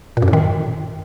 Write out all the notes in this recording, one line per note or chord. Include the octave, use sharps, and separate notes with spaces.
A#2
F#2
A2
D#3